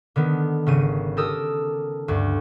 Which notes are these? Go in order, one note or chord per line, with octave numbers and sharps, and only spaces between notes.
D3 D#3 B3
G#1 C#3 D#7
G4 A4 A#4 D#6 E6
D2 G2